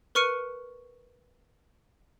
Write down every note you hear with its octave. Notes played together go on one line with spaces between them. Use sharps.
A#4 B4 C#6 F6 C#7 D#7